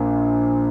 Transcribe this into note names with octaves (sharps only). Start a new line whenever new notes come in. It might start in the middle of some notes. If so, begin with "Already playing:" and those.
Already playing: A#1 A#2 A#3